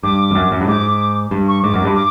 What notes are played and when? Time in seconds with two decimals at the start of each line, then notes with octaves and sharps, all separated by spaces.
0.03 G2 D6
0.31 F2
0.35 F#2
0.52 F#2
0.61 G2
0.67 G#2 D6
1.31 G2
1.48 C#6
1.63 G#2 D6
1.74 F#2
1.84 G2
1.96 D6